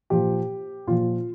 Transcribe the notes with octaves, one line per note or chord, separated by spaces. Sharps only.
A#2 F3 G4
A#2 F3 F4